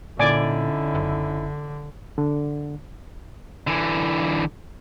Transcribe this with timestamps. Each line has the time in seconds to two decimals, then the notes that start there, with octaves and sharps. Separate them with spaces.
0.19 A#2 D3 C#4 D#4 E4 D5 G#5 D6
0.94 F#1
2.18 D3
3.67 D3 E3